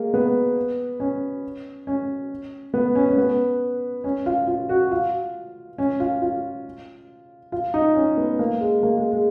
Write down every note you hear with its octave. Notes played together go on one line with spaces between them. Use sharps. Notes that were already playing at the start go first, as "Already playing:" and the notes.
Already playing: G#3 A#3
B3
C#4
C#4
B3
C#4
C#4
B3
C#4
F4
F4
F#4
F4
C#4
F4
F4
F4
D#4
C#4
B3
A#3
G#3
A#3
G#3
G#3